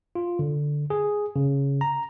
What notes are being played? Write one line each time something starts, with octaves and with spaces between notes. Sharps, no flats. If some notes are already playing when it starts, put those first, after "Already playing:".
F4
D3
G#4
C#3
A#5